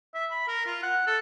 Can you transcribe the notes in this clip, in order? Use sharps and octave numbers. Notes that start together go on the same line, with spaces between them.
E5
B5
A#4
F4
F#5
A4